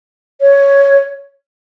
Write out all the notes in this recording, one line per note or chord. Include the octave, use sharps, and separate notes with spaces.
C#5